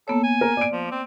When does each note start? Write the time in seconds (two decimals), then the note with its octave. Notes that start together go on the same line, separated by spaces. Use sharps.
0.08 A#3 B3 A4 C#5
0.24 G#5
0.41 A#4
0.57 D5 D7
0.73 F3
0.92 C4